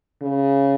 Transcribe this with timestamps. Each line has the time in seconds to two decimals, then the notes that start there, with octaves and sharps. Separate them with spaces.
0.22 C#3